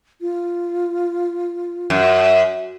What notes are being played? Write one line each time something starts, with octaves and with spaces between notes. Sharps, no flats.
F4
F#2